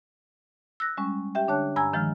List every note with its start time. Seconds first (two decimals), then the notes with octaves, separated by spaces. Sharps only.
0.80 E6 F#6 A#6
0.97 G3 G#3 C#4
1.35 G4 E5 G5
1.48 D3 D4 C#5 A5 F#6
1.76 G2 G#5 A#5 E6 G#6
1.93 D#3 F3 G#3 D#5 F6